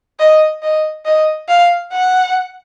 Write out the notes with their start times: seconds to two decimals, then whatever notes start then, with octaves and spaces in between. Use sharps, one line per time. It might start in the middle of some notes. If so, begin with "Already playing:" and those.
0.20 D#5
0.63 D#5
1.06 D#5
1.49 F5
1.92 F#5